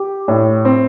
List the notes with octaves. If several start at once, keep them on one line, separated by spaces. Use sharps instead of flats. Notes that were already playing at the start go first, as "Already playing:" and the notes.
Already playing: G4
A2
C4